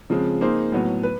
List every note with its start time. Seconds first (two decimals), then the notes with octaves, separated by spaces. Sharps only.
0.10 C#3 F3 G#3 C4
0.41 A#3 D#4 G#4 C5
0.72 A2 F#3 B3
1.03 B4